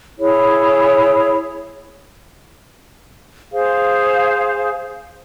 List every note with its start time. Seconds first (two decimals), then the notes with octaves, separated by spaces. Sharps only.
0.18 E4 G#4 C#5
3.52 G#4 C5 F5